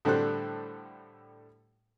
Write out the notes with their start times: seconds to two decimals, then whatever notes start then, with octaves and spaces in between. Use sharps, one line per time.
0.05 A2 D3 G3 A4 C5 F#6